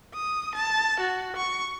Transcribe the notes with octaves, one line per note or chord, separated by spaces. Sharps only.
D#6
A5
F#4
C#6